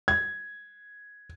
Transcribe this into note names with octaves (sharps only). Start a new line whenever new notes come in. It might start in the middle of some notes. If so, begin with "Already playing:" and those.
G#6